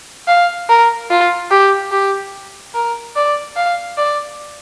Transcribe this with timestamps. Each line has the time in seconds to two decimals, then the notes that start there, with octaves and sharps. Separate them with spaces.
0.28 F5
0.69 A#4
1.10 F4
1.51 G4
1.92 G4
2.75 A#4
3.16 D5
3.56 F5
3.97 D5